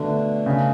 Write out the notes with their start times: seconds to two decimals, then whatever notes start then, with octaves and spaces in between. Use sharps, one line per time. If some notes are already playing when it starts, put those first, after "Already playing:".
Already playing: B2 D3 A3 D4
0.46 C#3